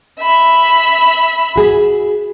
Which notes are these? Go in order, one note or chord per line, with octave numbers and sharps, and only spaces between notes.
E5 B5
F#4 G#4